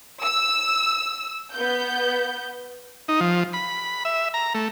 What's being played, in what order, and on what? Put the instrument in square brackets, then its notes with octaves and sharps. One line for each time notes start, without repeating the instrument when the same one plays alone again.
[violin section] E6
B3 G6
[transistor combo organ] D#4
F3
B5
E5
A#5
A3